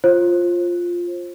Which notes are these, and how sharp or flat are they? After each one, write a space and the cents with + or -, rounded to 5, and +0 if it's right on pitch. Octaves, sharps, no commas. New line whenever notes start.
F4 +0 C5 +30